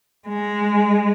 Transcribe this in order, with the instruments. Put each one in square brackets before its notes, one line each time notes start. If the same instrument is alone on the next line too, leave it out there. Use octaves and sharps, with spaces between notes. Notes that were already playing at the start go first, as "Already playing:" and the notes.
[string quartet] G#3